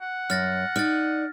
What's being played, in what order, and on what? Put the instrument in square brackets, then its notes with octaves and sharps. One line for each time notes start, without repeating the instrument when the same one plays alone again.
[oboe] F#5
[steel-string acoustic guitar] F#2 [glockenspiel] F6 A6 A#6
[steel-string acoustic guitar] D#4 D5 [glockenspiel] F6 A6